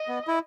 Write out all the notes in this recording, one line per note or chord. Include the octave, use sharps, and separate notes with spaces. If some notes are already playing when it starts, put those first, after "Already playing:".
Already playing: D#5
B3
E4